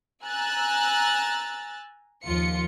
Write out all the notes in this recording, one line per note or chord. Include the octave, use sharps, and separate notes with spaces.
G#5 A#5 E6 F#6 A6
D#2 F3 F4 C#7